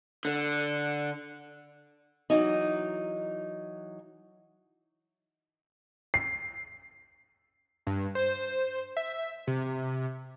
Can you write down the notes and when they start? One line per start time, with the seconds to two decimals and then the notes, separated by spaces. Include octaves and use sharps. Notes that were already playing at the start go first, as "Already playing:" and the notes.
0.25 D3
2.30 E3 F#3 D#4
6.14 C7
7.87 G2
8.15 C5
8.97 E5
9.47 C3